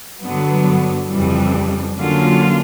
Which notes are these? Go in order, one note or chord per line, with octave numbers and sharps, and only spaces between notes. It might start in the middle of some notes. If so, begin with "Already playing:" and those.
G2 D3 F#3 B3
F2 C#3 E3 G3
D3 F#3 A#3 C#4 F4